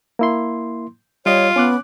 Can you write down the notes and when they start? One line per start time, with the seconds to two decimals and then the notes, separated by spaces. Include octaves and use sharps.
0.19 A#3 E4 C6
1.26 G3 F4 C#5 D#5
1.56 B3 C#4 D6 F#6